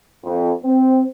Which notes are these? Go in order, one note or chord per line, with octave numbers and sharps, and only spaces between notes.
F2
C4